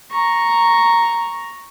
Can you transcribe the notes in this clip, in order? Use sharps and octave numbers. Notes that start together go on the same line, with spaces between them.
A#5 C#6